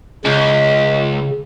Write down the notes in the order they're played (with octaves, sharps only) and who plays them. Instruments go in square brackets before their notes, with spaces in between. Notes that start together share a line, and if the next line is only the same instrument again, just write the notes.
[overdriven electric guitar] C#2 [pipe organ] C#3